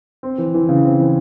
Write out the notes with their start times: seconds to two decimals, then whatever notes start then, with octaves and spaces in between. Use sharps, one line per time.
0.23 C4
0.38 E3
0.54 E3
0.69 C#3
0.84 C4
0.99 E3